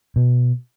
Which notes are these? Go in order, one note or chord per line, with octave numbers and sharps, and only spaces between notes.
B2